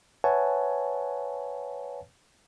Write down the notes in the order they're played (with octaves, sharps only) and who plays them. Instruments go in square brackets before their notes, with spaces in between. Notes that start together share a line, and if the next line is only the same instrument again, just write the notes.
[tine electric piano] B4 C#5 E5 F#5 G#5 A5